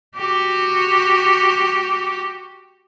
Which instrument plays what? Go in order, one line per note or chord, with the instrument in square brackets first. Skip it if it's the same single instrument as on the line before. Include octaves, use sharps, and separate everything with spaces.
[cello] F#4 G4